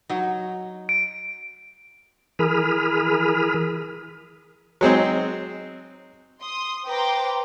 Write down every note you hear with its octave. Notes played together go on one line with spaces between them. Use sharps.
F#3 D#4
D7
E3 G#4 A#4 B5 D#6 F6
F#3 G#3 C4 D#4
C6 D#6
B4 C5 G5 A#5 C6 D6